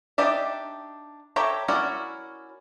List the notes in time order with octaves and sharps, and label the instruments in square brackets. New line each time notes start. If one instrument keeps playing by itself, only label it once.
[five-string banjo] D4 D#4 G4 D5 E5
G4 A4 C#5 E5 A#5
C#4 E4 F#4 A#4 D5